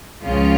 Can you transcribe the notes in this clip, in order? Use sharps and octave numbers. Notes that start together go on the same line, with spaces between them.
C#2 C#3 F3 F4